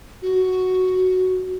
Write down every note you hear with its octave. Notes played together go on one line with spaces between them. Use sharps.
F#4